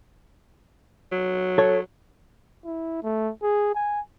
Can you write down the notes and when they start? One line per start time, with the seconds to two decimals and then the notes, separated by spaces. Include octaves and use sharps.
1.12 F#3
1.58 A4 C#5
2.65 E4
3.03 A3
3.42 G#4
3.75 G#5